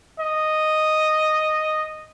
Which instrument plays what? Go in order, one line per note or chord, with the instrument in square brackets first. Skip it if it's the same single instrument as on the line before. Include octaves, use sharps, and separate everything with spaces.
[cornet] D#5